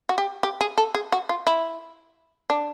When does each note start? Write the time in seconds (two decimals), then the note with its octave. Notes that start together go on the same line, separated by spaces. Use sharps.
0.09 F#4
0.18 G4
0.43 G4
0.61 G#4
0.78 A4
0.95 G#4
1.12 F#4
1.29 F4
1.47 E4
2.50 D4